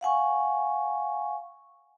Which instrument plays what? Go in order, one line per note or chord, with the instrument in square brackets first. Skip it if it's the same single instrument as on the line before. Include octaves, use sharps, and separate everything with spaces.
[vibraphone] F5 F#5 G#5 C#6